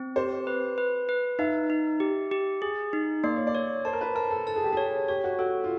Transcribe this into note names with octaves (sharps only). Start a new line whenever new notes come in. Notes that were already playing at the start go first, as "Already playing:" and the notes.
Already playing: C4
G4 C5
B4
B4
B4
D#4 E5
D#4
G4
G4
G#4
D#4
A#3 D5
C#5
D5
C#5
C5 A5
A#4
B4
A#4 A5
A4
A4 A5
G#4
G4
G#4 C#5
G4 C#5
F#4
F#4 A4
F4